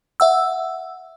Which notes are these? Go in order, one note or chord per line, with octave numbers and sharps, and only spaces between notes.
E5 F#5 E6